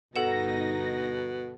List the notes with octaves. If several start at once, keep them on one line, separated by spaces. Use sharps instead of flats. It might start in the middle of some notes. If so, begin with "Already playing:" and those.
G1 B2 D#4 A4 F#5 A#6 E7